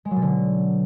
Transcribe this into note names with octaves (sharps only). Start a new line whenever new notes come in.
G#3
F#3
B2
D3